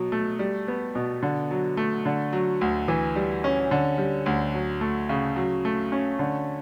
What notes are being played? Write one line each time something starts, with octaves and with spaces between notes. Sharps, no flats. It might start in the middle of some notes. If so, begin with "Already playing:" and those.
Already playing: B2 F#3
A3
G3
B3
B2
D3
F#3
A3
D3
F#3
D2
E3
G3
C#4
D3
G3
D2
F#3
A3
C#3
F#3
A3
C#4
D3